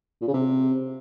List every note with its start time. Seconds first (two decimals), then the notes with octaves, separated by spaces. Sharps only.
0.22 A#2
0.28 C#3
0.34 C3